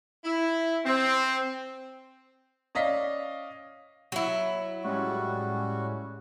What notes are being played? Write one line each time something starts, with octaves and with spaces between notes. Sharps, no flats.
E4
C4
C#4 D5 D#5 F5 B6
F#3 E4
A2 G3 G#3 C#4 F#4